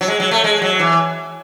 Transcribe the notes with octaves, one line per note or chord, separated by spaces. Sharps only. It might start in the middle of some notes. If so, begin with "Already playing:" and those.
F#3
G#3
F#3
A3
G#3
F#3
E3